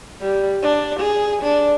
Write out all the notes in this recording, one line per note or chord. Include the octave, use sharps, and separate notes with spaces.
G3
D4
G#4
D4